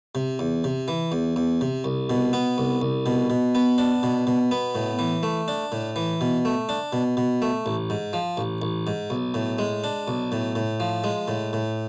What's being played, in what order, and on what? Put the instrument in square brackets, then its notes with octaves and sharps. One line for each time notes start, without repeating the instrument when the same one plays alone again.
[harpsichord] C3
E2
C3
E3
E2
E2
C3
C2
B2
B3
C2
C2
B2
B2
B3
D4
B2
B2
B3
A2
E3
A3
D4
A2
E3
B2
A3
D4
B2
B2
A3
A1
G#2
F3
A1
A1
G#2
B1
A2
G#3
D4
B1
A2
A2
F3
G#3
A2
A2